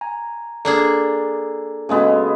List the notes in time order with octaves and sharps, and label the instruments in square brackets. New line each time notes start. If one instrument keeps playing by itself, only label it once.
[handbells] G#5 A#5
[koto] A#3 D4 G#4 [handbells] A4 D5 A#5
[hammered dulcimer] C#3 G#3 B3 [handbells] F#4 A4